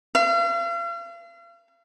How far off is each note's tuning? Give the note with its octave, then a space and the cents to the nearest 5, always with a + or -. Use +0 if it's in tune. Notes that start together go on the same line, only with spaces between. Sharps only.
F5 -40